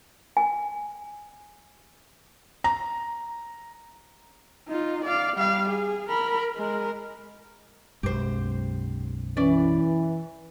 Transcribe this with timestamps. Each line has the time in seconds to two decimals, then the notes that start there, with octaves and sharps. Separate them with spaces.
0.37 G#5
2.64 A#5
4.68 D#4 F4
5.05 D5 F5
5.36 G3 F5
5.69 G#4
6.09 A#4 B5
6.55 G#3 A#4
8.03 B1 F#2 G#3 G4 C5
9.37 E3 C#4 D5